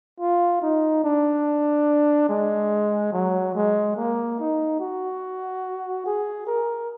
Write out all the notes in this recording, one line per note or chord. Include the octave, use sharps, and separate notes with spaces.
F4
D#4
D4
G#3
F#3
G#3
A#3
D#4
F#4
G#4
A#4